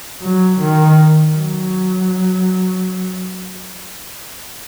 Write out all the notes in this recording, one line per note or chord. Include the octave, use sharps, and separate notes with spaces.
F#3
D#3
F#3